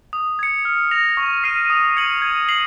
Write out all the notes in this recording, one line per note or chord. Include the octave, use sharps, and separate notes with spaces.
D#6
G#6 C#7
F6
A#6 F7
C#6
F6 C7 D#7
D#6
G#6 C#7 F#7
G#6
C7 F#7